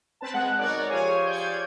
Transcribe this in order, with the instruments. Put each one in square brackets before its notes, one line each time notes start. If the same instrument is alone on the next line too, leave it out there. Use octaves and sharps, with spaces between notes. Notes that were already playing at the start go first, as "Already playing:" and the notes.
[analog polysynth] C4 B4 A5
[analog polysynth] G#3 [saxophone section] F#5 [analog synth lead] F#6
[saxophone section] B2 D#3 F#3 [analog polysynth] A#4 C#5 D5
[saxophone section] F3 G4 G#4 [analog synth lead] C#5 [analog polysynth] G#5
[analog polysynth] C#5 D5 G#6 [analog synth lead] G6